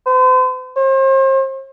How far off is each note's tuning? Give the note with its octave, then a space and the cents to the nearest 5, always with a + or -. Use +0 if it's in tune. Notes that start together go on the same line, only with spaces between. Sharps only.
C5 -40
C5 +40